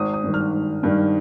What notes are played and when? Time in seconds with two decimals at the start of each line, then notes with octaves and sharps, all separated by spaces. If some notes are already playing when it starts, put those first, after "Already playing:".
Already playing: G#1 D#6
0.14 D#6
0.24 G2 D#3
0.34 F6
0.53 G#1
0.83 G2 D#3